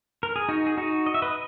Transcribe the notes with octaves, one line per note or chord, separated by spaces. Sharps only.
A#4
G#4
D#4 F#4
G#4
D#4 F#4
D#5
E5
B4 D#5